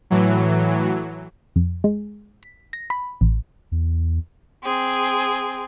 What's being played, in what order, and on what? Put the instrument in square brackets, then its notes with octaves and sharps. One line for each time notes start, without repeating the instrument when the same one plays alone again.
[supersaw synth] A2 E3 F#3
[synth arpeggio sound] F2
G#3
B6
A#6
B5
A1
[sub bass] E2
[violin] C4 G#4